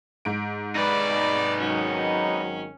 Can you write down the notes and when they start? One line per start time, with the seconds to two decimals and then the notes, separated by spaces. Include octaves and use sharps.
0.25 G#2 D7
0.75 D#4 B4 D5
1.60 G#1 D#3 F#3 C#4